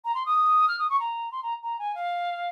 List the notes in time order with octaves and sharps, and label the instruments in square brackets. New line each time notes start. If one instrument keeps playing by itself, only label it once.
[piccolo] A#5
C6
D#6
F6
D#6
C#6
A#5
C6
A#5
A#5
G#5
F5